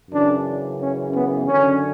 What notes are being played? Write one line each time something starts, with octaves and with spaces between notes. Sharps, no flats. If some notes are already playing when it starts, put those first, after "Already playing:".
F#2 C#3 E3 D4
C#4
B3
F#2 D3 C#4